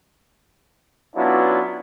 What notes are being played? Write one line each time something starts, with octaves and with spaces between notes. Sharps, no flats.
F#3 B3 C#4 D4 E4 F4